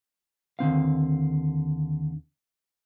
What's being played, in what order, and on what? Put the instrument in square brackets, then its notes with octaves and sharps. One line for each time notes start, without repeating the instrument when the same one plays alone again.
[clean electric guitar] D#2 D3 C4 F5